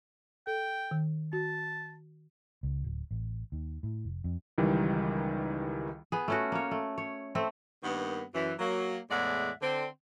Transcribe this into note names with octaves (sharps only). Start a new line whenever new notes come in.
A4 G5
D#3
F#4 A5
C#2
D1
A1
D#2
A2
F1
F2
C#2 D#3 E3 G3
B3 G#4
A3 C#4 F#4
A#3 C#5
A3
C#5
A3 C4
G2 D#3 A#3 B3
F#2 E3
F#3 A#3
E2 A2 G#3 D5 E5 F#5
D3 C4